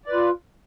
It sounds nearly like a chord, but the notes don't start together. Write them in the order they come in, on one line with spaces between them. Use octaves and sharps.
D5 B4 F4